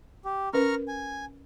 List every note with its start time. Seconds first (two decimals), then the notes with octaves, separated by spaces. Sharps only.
0.25 G4
0.53 C#4 A#4 B4 A#5 C#6 F6
0.88 G#5